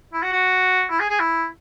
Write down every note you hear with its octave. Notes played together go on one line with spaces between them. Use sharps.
E4
F#4
F#4
E4
G#4
G#4
E4